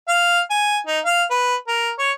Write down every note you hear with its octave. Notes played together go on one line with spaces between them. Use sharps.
F5
G#5
D#4
F5
B4
A#4
C#5